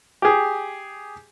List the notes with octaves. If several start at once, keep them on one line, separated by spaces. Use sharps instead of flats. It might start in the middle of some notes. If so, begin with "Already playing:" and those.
G4 G#4